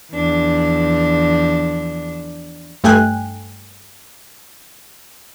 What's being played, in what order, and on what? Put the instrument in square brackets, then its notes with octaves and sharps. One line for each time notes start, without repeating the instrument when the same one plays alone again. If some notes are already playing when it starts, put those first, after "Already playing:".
[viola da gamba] E2 F3 D4
[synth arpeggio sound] G2 A3 G5 G#5 F#6